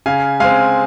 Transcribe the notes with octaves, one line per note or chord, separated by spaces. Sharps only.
C#3 F5 G#5
G#3 C4 F5 G#5